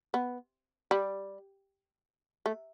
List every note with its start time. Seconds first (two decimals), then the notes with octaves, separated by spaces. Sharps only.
0.14 B3
0.91 G3
2.46 A3